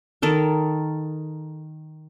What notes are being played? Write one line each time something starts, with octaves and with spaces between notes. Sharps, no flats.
D#3 A4 A#4